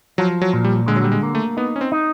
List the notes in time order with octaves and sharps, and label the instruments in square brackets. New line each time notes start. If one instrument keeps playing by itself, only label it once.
[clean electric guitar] F3 [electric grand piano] F#3
[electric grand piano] F#3
[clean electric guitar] A#2
[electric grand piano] G3
[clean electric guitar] D3 [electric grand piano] G#3
[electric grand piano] F#3
G3
G#3
[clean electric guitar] A#3
[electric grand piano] A3
[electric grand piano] B3 [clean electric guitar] D#4
[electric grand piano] C#4
C4
[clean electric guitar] D#4